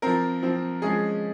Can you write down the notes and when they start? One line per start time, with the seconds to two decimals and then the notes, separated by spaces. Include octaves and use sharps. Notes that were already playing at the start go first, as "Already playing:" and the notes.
0.02 F3 C4 A#4
0.43 F3 C4
0.82 F3 G#3 C#4 G#4